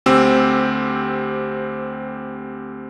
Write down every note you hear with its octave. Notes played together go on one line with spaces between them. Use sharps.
D2 C4 G4 E6